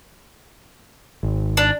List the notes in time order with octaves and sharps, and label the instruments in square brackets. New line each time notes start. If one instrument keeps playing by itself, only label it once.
[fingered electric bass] G#1
[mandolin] D4